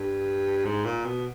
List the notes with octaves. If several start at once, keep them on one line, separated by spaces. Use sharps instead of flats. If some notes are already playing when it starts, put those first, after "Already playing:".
Already playing: G2
G#2
A#2
B2